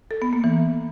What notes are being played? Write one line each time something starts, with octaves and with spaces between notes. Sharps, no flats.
A4
B3
A#3
E3